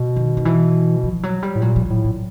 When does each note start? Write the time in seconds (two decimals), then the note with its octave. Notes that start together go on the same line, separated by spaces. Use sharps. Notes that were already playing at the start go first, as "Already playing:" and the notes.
Already playing: B2
0.16 D#3
0.37 D#3
0.45 E3
1.03 F3
1.23 F#3
1.43 G3
1.55 A2
1.62 A#2 F#3
1.76 F#3
1.90 A2
2.04 F#3